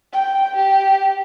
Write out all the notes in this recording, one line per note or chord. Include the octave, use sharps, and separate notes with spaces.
G5
G4